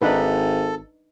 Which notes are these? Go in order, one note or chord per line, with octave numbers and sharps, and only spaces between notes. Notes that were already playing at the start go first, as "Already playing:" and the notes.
G#1 D4 D#4 A4 B4